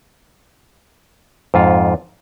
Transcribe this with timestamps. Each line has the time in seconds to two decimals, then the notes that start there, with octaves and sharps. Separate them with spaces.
1.54 F2 G#2 F4